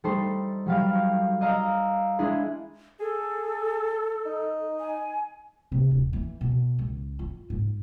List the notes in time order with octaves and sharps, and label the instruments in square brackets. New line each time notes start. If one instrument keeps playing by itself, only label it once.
[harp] G3 A3 D#4 A4 C5
F#3 G3 F5
D5 D#5 F5 A#5 E6
G#3 D4 E4 G#4 B4
[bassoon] G#4 [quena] A4
[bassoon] D#4
[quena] G#5
[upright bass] C3
D#1
E3
B2
C#2
F4
G#2